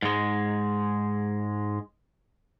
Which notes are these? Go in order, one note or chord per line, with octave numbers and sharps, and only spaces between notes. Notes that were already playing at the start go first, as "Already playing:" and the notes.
G#2 G#3